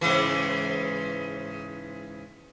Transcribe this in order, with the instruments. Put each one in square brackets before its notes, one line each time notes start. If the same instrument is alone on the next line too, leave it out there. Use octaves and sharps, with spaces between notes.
[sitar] G#2 C#3 E3